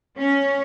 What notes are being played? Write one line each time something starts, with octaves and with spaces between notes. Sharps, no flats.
C#4